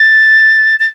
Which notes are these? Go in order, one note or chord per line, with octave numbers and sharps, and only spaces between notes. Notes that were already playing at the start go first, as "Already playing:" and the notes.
Already playing: A6
A6